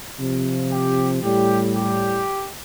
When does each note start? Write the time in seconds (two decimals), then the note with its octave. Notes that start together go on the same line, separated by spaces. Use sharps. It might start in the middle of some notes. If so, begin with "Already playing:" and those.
0.20 C3 F3
0.71 G4
1.22 A2 G3 G4
1.75 G4